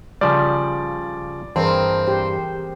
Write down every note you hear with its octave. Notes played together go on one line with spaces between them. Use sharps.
C#3 F3 G3 D5
G2 E3 C4 G#4 A#4
G4 C5